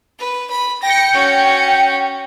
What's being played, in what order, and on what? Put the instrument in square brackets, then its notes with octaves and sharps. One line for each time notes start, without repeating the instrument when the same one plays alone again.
[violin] B4
B5
[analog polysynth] G5 C#7 [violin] A#6
[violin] C#4 F#4